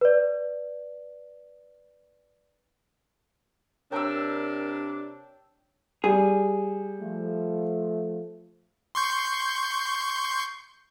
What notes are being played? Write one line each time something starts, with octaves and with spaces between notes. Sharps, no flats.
B4 D5
C3 D4 A#4 C#5 G5 A5 E6 D7
G3 G#4
F3 A3
C6 C#6 G6